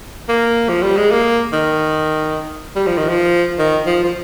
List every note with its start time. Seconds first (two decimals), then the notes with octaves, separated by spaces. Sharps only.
0.29 A#3
0.69 F3
0.83 G3
0.97 G#3
1.11 A#3
1.53 D#3
2.75 G3
2.87 F3
2.98 D#3
3.09 F3
3.59 D#3
3.86 F3
4.04 F3